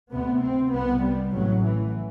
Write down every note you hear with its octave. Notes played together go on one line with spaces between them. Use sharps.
D2 C3 B3
C4
C2 C3 B3
G3
A1 A2 F#3
E3